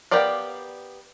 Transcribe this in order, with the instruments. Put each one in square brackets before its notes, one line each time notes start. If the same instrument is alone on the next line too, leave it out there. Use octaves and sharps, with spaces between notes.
[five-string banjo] B3 G4 A#4 D5 F5